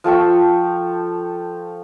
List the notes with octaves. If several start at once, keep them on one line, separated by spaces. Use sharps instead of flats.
F3 A4 G5 C#6